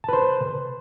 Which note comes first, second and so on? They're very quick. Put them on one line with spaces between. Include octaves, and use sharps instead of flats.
A5 B4 C5